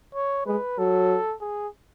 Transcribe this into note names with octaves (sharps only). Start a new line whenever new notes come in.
C#5
G#3 B4
F#3 A4
G#4